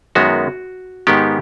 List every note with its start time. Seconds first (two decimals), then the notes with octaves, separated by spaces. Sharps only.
0.15 F#2 D#3 G#3 B3 F#4
1.07 G#2 D#3 G#3 B3 G4